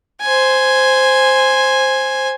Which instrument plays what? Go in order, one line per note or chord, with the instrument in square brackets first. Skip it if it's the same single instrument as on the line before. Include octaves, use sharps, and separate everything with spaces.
[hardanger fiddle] C5 G#5